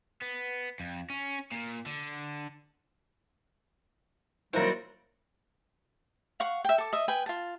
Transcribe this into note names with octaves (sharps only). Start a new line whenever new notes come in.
B3
F2
C#4
A#2
D3
D#3 F#3 G3 A#3 E4 F#4 A#4 C5
F5 F#5 C#6
E5 G5
A4 D6
D#5 E5
B4 G5 G#5
F4 A5